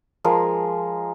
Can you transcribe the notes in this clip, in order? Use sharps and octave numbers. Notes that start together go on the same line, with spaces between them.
F3 G#3 G#4 A#4